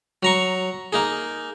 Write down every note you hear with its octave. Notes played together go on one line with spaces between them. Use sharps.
F#3 A#5 C#6
A#3 D#4 G#4